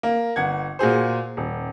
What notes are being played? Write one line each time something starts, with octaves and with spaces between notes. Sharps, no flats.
A#3
G1 F#5 G#6
A#2 F#4 G#4 C5
D#1